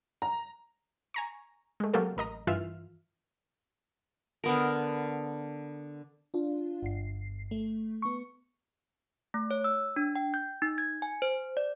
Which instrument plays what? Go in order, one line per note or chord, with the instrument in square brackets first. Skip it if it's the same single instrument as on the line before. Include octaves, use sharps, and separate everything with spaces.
[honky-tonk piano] A#5
[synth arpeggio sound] G#5 A#5 C#6
G#3 A3
C3 F#3 A#3 G4 A4 A#4
A1 A#4 D#5 A#5
G2 E3 F4 E5 F6
[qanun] D3 B3 A#4
[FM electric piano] D4 F4
G1 C7
A3
B3 C#6
[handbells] A3
C#5
E6
D4
G5
G6
D#4
G#6
G#5
C5
D5